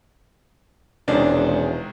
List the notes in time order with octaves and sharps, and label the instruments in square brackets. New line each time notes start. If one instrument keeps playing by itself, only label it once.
[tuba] E1 [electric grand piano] C3 D#3 G#3 [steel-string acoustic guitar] C#4 [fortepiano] D4